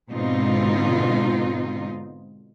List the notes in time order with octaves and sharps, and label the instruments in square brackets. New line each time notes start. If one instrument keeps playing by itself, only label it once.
[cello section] G#2 B2 D3 C4 D#4 F4